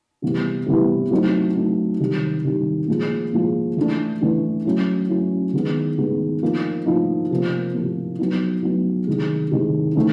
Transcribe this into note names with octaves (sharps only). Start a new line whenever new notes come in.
C3 E3 G3 B3 E4
C3 E3 G3 B3 E4
F#3 A3 C4 D#4
F#3 A3 C4 D#4
C3 D#3 G3
C3 D#3 G3
A#2 F3 G#3
A#2 F3 G#3
E3 A3 D4
E3 A3 D4
F#3 A3 C#4 E4
F#3 A3 C#4 E4
D#3 G#3 B3
D#3 G#3 B3
F3 A#3 D#4
F3 A#3 D#4
C3 F3 A#3
C3 F3 A#3
F#3 B3 D#4
F#3 B3 D#4
C3 D#3 G#3
C3 D#3 G#3
E3 A3 C4 D#4